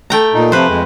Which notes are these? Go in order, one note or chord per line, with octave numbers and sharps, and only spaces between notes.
A3 G5 A#5
A#2 D#4
C3 F3 B4 C5
F2 G#3